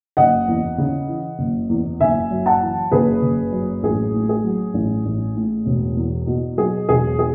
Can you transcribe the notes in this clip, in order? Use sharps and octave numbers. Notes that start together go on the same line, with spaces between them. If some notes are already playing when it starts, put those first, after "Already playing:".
F#1 D#5 F#5
E2
C#3
E3
F#1
E2
F#1 E5 G#5
F#2
F#5 A5
E3
F#1 G#4 B4
F#1
F#2
A1 G#4
A2
G#4
F#3
A1
A1
A2
E1
E2
B2
F#3 G#4
E1 G#4
G#4